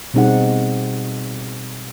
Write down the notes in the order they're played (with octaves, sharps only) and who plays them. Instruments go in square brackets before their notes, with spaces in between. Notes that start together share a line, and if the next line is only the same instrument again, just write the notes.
[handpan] B2 G3 C4 D#4 G#4 F#5